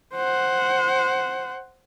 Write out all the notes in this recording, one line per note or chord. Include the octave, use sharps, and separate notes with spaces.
C5 F#5